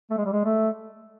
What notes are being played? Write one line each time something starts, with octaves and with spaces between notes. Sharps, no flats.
A3
G#3
G3
G#3
A3